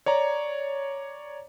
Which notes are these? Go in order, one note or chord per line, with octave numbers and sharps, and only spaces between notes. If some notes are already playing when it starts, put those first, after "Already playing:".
C#5 D5 A#5